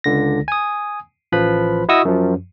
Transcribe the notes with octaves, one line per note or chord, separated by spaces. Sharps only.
C#2 D3 A#6
G#5 D#6
A1 F3 B4 B5
E4 F#4 D#5 C#6 D#6 E6
F#2 F3